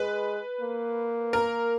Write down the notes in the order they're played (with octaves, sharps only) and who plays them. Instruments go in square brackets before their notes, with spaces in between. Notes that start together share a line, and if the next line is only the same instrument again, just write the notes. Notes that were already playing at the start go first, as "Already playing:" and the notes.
Already playing: [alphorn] G#3 [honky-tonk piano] B4
[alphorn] A#3
[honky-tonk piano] A#4